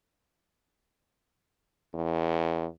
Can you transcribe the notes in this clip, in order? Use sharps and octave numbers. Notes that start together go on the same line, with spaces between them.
E2